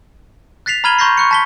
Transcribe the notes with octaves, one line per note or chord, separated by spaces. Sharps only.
F#6 A6 B6 C7 F7
A#5 B5 F6 G#6 D#7 G7
A#5 C6 C#6 G6 A#6 C7
C#6 F#6 C#7
A5 B6 G7